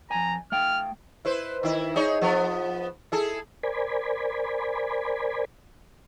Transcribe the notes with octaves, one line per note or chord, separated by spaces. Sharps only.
F2 G#5 A#5
A3 F5 G5 F6
E4 B4 C5
D#3 E4
D#4 G#4 C#5
F3 B3
E4 G#4 A4
A#4 C5 D5 G#5 B5